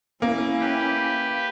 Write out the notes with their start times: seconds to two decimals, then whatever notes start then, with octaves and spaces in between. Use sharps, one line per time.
0.22 A#3 C#4 E4
0.61 G4 B4